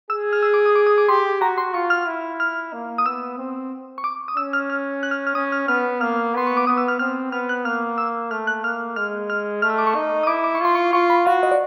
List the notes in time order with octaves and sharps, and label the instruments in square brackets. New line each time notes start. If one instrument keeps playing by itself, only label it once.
[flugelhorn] G#4 [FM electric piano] E6
[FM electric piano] F6
E6
D6
D#6
D6
D#6
D6
[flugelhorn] G4 [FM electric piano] C6
[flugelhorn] F#4 [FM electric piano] A#5
[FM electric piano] C6
[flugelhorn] F4 [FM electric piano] C#6
[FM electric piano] F6
[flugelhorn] E4
[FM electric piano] F6
[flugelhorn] A#3
[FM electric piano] D#6
[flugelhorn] B3 [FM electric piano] E6
[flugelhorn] C4
[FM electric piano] C#6
D6
D#6
[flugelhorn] C#4 [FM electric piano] E6
[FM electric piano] F6
F6
F#6
F6
F6
[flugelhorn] C#4 [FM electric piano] D#6
[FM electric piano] F6
[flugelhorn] B3 [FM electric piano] F6
[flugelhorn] A#3 [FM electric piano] F6
[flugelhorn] B3 [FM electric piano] C6
[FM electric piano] C#6
D6
[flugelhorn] B3 [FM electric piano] D#6
[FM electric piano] E6
F6
[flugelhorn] C4 [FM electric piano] F6
[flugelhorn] B3 [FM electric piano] F6
[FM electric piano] F#6
[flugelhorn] A#3 [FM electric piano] F6
[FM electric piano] E6
[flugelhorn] A3 [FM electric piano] F6
[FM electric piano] F#6
[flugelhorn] A#3 [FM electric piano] F6
[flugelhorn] G#3 [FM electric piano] F6
[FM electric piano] F6
[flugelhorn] A3 [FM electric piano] F6
[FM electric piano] E6
D6
C#6
[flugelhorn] D#4
[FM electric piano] D#6
[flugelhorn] E4 [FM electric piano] D6
[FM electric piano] D6
C#6
[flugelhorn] F4 [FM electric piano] C6
[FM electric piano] C#6
[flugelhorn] F4 [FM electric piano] C#6
[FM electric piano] B5
[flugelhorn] F#4 [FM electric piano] F5
[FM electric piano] D#5
D5